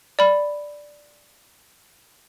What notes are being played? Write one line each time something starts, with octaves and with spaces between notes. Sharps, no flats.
D5 B5